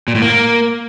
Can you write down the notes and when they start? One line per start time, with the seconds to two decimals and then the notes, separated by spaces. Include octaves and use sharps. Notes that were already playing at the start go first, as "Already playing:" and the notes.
0.08 A#2
0.15 A2
0.22 A#3